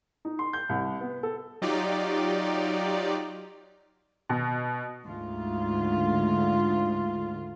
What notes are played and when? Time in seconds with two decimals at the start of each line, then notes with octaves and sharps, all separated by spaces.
0.25 D#4
0.39 C6
0.53 G6
0.69 C2
1.01 B3
1.23 A4
1.62 F#3 D#4 F4 G4 D5
4.29 B2
5.06 D2 G#2 F4